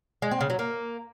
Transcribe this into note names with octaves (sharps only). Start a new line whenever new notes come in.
G#3
C4
C#3
F#3
A#3